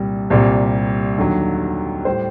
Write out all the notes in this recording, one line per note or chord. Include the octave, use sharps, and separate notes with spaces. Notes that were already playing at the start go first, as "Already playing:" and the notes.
Already playing: C2 A#2 G3
C2 A#2 G3
D#2 D3 F#3
A2 G3 C5